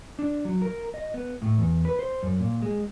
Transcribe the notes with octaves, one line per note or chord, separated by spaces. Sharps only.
D4
F#3
A#4
D#5
B3
A2
E2
B4
C5
F#2
A#2
G#3